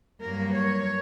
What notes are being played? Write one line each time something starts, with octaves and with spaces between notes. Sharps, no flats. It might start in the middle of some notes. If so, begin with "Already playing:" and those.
G2 F#3 A#3 A#4
C#5